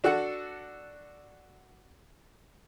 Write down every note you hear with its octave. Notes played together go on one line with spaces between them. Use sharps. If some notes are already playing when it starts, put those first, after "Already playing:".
D4 F#4 A4 F#5